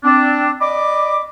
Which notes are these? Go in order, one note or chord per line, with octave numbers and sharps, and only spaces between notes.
C4 D4
D5 D#5 B5 D6